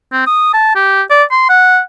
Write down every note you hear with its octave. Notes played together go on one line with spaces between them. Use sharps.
C4
D#6
A5
G4
D5
C6
F#5